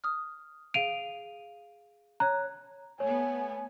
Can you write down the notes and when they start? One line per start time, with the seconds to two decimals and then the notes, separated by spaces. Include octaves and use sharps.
0.04 D#6 F6
0.74 G#4 F5 D7 D#7 F7
2.20 C#5 A#5 F#6
3.00 A3 B3 C#5 G#5